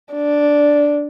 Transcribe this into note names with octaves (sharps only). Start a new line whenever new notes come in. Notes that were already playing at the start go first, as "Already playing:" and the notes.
D4